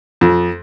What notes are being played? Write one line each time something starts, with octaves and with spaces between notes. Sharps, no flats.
F2